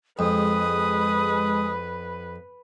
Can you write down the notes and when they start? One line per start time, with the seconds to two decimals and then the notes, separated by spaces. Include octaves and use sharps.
0.19 F2 G#3 B4 D#6